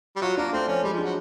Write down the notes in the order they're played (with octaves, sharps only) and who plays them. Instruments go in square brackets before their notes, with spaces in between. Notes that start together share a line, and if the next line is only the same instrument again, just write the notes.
[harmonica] G3
[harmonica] F#3 [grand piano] F4
[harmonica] A#3 [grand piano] D4
[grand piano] A3 [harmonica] C4
[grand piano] F3 [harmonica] C#4
[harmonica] G3 [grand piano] G#3
[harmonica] F3 [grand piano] D4
[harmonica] F#3